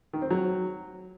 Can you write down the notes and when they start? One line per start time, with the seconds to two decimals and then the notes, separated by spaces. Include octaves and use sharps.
0.13 D#3
0.22 C4
0.31 F#3